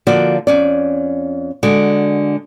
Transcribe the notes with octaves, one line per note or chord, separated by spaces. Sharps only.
D3 F3 A#3 F#4 D5
F2 C#4 D5
D3 G#3 F#4 D5